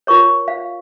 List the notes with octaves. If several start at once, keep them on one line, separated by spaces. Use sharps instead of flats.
F4 A#4 C#5 C#6
F5